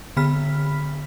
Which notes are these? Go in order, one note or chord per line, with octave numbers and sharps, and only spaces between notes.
D3 B3 B5 F6 B6